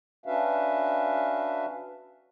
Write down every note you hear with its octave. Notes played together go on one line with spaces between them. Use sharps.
C#4 D4 F#4 B4 E5 F5